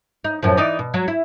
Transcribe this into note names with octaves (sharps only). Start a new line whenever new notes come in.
D#4
F#2 A2 F3
E3 D#4 D5
B2
F#3
E4